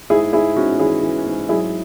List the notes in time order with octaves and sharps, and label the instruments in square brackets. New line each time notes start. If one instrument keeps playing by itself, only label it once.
[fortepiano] G#2 E4 G#4
G#2 E4 G#4
G#2 C#4 F#4
E3 E4 G#4
E3
G#2
F#3 E4 G#4